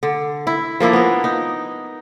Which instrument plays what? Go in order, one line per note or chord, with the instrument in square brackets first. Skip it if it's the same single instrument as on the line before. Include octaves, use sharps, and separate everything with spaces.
[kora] D3
E4
F3 A#3 D4 E4
B3 A#4
D#4